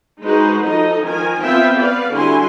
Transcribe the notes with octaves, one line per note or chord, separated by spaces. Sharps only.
G#3 D#4 F#4 G#4 B4 C5
F3 D#4 A4 D#5
D#3 F3 A#4 G#5
B3 C4 F4 E5 F5 G5
B3 B4 D5 F5
D3 G3 E4 F#4 G#5 C6